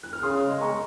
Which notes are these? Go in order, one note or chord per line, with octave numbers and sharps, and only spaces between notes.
F#6
F6
C#3 C6 D#6
G#3
A#5 C#6